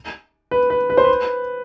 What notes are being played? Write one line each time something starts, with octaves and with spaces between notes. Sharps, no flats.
B4
B4
B4
C5
B4